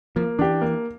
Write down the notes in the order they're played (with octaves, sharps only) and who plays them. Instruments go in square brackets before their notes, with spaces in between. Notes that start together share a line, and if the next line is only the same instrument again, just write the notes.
[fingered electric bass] F3 [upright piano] A#3
[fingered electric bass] E3 [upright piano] D4 G4
[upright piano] A#3